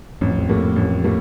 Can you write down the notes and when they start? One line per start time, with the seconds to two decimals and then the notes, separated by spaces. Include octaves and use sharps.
0.21 A1 F2
0.39 F2
0.49 A2 G3 A#3
0.76 A1
1.04 A2 G3 A#3